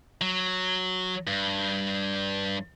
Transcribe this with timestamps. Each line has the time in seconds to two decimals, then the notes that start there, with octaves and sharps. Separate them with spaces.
0.21 F#3
1.27 G2